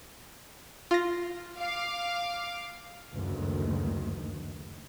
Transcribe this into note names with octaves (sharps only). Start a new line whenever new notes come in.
F4 A#6
F5 D6
F#1 D2 G2 D#3